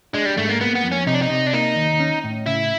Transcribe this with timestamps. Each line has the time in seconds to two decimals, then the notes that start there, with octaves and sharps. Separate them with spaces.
0.13 G#3 D4
0.25 G3
0.37 G#2 A3
0.49 A#3
0.60 A#3 B3
0.75 B3
0.84 F2
0.92 C#4
1.07 C3 D#4
1.14 D4
1.22 D#4
1.30 C3
1.46 D4
1.53 A#3 D#4
1.76 D#2
2.00 C#4
2.24 A2
2.46 C#3 E4